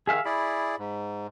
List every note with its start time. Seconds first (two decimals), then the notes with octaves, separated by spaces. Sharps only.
0.07 D#3 G#4 E5 F5
0.25 E4 G#4 D5 B5
0.79 G#2